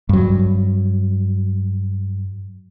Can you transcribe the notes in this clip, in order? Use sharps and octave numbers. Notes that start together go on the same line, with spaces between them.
G2 F#3